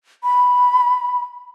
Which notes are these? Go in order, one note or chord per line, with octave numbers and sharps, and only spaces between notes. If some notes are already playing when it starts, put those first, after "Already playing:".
B5